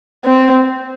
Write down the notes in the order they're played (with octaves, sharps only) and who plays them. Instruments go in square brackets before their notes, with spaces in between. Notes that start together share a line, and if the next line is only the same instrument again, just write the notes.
[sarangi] C4